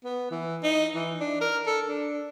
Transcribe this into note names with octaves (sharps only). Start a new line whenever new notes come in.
B3
E3
D#4
E3
D4
A#4
A4
D4